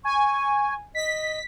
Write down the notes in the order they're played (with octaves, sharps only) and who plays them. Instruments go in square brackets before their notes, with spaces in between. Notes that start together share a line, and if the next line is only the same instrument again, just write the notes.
[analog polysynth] G#5 [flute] C#6
[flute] D#5 [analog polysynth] B6